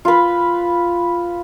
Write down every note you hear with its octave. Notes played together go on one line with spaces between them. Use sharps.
F4 B4